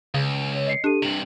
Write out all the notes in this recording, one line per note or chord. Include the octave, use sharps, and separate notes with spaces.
C#2 C#3
C#5
D#5 C7 C#7
D4 G4 A4 D#7
G2 C3 F#7